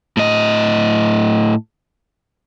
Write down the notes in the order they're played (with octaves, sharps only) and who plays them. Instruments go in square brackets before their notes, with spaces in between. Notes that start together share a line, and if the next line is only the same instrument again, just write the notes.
[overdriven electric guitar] A2 D#5